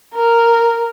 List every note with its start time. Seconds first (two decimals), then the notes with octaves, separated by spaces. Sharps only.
0.14 A#4